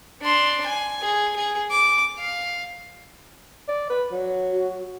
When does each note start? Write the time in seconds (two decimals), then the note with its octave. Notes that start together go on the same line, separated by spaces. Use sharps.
0.21 D4 C6
0.65 G#5
1.02 G#4
1.36 G#4
1.71 D6
2.18 F5
3.68 D5
3.90 B4
4.11 F#3
4.52 F#4